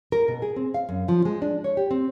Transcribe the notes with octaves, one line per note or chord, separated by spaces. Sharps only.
A#4
B2
G#4
C4
F5
F#2
F3
G#3
D4
C#5
G4
C4